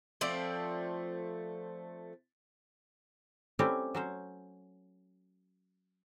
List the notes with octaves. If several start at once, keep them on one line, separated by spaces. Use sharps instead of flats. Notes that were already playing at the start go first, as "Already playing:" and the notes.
F3 A3 C4 D5
G3 A3 C4 C#4 E4 G4
F#3 C#4 C5